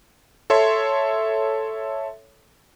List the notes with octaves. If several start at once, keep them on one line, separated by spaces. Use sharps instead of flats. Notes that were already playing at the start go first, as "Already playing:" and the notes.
A4 C#5 E5 C6